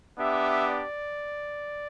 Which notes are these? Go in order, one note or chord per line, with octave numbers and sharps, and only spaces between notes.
B3 D4 G4 E5
D5